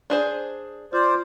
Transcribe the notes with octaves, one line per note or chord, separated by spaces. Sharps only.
D4 G#4 C5
F4 C5 D5